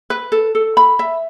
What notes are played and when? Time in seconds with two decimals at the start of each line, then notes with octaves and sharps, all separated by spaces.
0.10 B4
0.32 A4
0.55 A4
0.77 B5
0.99 E5